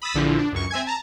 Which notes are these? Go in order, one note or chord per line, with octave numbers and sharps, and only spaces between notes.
B5 D#6 E6 A6 B6
A#1 D3 E3 F3
D4
C#2 F#2 C#6
C4 E5 G#5 G#6
A5 A#5